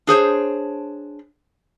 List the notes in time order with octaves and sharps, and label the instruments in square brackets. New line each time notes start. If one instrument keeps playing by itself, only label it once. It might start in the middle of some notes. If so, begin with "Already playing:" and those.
[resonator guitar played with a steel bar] D4 G#4 C5 C#5